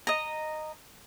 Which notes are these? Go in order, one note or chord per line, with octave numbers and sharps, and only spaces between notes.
D#5 A#5